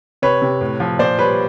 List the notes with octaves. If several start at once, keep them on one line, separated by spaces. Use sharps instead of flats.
C3 B4 C#5
C3
A2
F3
A#2 C5 D5
G3 B4 C#5